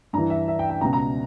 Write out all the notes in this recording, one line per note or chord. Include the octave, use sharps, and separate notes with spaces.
G2 E3 A#5
E5
E5
G5
G5
C#2 B2 A#5
A#5